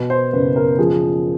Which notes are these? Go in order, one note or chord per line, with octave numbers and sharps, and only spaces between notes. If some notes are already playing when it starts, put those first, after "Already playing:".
Already playing: B2 B4
C5
F#1 B4
A#4
F3 G#4